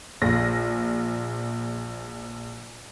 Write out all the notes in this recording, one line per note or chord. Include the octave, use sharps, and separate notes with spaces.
A#1 A#6